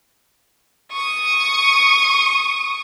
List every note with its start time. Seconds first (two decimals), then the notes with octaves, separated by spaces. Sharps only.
0.93 C#6 D#6